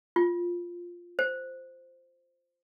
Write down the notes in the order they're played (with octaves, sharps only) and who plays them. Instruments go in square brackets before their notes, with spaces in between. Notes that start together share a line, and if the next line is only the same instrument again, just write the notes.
[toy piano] F4
C5